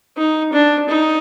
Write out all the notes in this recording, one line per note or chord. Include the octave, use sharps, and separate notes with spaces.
D#4
D4
D#4